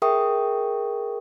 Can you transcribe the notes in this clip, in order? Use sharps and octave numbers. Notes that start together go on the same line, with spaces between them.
G#4 A#4 E5 G5 C#6 D#6